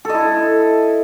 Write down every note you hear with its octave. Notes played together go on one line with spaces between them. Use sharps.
E4 A4 D#5